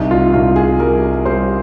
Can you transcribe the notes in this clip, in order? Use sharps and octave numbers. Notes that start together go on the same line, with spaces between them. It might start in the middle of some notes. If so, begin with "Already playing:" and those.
Already playing: C2 D#4
F4
C2 F4
G#4
G3 A#4
G3 C5